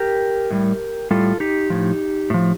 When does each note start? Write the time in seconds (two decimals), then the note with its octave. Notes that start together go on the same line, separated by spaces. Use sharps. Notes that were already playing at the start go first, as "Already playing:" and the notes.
Already playing: G4 A#4
0.51 A2 G3
1.11 A2 G3 F4 A4
1.40 D#4 G4
1.70 A2 F3
2.30 A2 F3